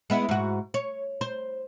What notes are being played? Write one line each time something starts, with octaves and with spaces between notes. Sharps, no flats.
G#3 B3 E4
G#2 F#4
C#5
C5